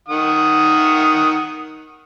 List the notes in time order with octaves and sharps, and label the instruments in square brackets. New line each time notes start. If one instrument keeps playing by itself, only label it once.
[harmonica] D#3 F#5 D#6